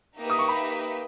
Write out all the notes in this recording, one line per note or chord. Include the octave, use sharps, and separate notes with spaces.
A#3 D#4 G4 B4 E5
D#6
C#6
B5